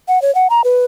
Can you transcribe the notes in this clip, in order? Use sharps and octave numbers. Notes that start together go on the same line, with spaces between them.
F#5
C#5
F#5
A#5
B4